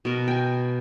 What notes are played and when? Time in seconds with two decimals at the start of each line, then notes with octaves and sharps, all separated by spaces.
0.05 B2 A#4
0.28 G5 G#5